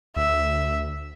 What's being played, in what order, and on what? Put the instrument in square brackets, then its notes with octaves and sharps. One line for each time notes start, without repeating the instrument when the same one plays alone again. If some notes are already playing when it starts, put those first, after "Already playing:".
[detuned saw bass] D2 [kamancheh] E5